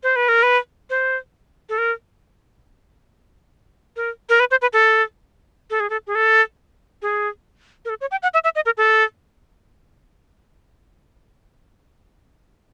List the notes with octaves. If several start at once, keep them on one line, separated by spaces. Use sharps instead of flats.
C5
B4
A#4
B4
C5
A4
A#4
A#4
A#4
B4
C5
B4
A4
A4
G#4
A4
G#4
A4
G#4
A#4
A4
C#5
G5
F#5
E5
E5
D#5
A#4
A4